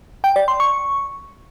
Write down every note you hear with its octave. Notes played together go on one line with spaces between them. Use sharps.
G5
D5
C6
C#6